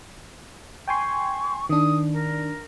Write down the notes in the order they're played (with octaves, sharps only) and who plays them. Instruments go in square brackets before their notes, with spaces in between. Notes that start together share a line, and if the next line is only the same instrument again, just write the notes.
[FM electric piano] G5 G#5 C6 [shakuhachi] C#6
[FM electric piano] D#3 D4 [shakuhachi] D#6
[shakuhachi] A#4